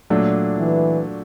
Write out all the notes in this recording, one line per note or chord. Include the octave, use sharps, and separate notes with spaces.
A#2 F#3 A3 D4
E3